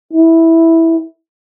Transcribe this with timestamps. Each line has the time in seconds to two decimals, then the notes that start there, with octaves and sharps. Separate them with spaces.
0.13 E4